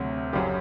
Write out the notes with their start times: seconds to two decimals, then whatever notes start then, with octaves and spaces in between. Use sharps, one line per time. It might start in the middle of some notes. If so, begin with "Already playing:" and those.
Already playing: D2 C3 F#3
0.33 F#1 F#2 F#3 G4